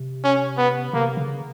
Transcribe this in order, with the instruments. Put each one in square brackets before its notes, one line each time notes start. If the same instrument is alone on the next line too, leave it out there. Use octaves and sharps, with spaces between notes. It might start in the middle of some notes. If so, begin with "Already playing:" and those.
Already playing: [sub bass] C3
[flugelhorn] C#4
B3
[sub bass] C3 [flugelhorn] A#3
[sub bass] C#3